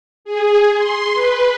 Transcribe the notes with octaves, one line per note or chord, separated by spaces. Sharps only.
G#4
C6
B4